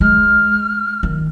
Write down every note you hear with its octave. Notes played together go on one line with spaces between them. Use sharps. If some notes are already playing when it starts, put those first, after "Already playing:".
G#3 F6
D#3